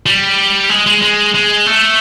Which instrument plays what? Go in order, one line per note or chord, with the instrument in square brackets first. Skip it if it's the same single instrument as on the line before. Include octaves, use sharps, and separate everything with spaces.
[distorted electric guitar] G3
G#3
G#3
G#3
G#3
A3